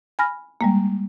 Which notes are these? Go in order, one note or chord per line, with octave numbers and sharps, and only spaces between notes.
G#5 B5 F6 A#6
G3 G#3 A#3